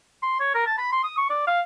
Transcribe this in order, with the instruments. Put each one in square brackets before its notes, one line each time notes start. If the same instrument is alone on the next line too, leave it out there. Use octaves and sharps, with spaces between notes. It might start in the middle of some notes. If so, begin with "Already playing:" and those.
[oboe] C6
C#5
A#4
A5
B5
C6
D#6
C#6
D5
F5